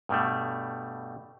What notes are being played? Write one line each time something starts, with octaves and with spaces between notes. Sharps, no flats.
G2 B2 G3 A3